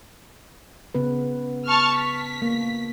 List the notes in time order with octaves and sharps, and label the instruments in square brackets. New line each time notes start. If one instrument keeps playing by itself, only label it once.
[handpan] C#3 B3 B4
[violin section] A5 C#6 F6
B6
[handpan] A#3